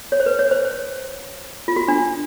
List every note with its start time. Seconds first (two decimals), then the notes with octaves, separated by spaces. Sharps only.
0.12 C#5
0.20 C5
0.26 B4
0.39 C#5
0.51 C5
0.65 C5
1.68 F4
1.76 F#4
1.88 D4